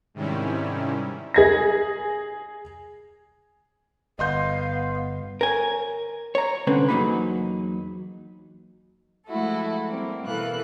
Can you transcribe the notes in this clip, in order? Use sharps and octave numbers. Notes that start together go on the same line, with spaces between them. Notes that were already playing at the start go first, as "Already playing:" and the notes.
G#2 C3 D#3 G3 C#4 E4
G#4 G#6 A#6
G1 B3 D#5 F5 C6 G6
A#4 C#5 G#5
C#5 A#5
C2 D3 C4 C#4 B4
E2 F#3 A#3 D#4 G#4 B5
F3 G#3 A3 E4 F#4 A4
G3 A#3 C4
B2 E3 A4 A#4 F5 F#6